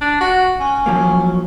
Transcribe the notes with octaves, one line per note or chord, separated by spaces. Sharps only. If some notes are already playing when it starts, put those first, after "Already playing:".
D4
F#4
C#4
F3 F#3 A#3